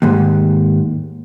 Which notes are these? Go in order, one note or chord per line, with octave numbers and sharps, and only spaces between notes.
D#2 G#2